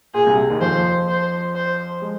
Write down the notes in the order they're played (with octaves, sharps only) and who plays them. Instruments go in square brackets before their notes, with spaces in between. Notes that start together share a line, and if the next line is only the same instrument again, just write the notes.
[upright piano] A#2 [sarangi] G#4
[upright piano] C2 C3
D#2 D#3
[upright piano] F2 F3 [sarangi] C5
[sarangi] C5
C5
[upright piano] G#3